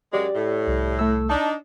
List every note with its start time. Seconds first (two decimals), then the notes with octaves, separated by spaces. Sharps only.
0.13 F#2 F#3 G#3 G4 D5
0.35 A2
0.67 C2
0.99 A3 A4 E6
1.30 D4 D#4 A5